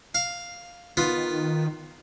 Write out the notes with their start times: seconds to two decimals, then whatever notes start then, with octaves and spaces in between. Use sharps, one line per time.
0.15 F5
0.97 D#3 B3 F4